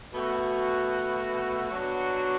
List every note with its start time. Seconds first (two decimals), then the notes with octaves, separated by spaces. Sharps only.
0.13 B2 A3 F#4
1.70 B2 F#3 D4 F#4